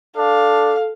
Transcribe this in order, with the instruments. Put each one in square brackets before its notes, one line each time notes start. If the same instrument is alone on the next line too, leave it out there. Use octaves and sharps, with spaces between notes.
[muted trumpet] D4 [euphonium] A4 [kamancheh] F5